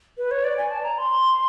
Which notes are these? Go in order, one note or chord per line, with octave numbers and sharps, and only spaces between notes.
B4
C#5
D5
G#5
A5
A#5
C6